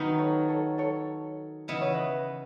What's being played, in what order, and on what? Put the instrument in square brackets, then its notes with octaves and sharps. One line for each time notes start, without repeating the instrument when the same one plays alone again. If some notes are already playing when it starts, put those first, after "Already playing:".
Already playing: [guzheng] D#3 F#3 B3 D#4 F#4
[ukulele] A4 C#5
A4 C#5
A4 C#5
[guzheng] C#3 E3 B3 [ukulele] D#5
[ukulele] C#5
B4 D#5